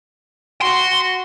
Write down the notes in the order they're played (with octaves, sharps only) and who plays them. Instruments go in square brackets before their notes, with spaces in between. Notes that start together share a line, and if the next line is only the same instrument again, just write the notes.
[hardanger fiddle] F#4 [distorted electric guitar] C6